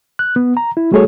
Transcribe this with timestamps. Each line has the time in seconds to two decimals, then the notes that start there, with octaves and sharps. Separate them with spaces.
0.19 F#6
0.36 B3
0.57 A#5
0.77 E4
0.92 G3 A3 F#4 G#4 A4 C#5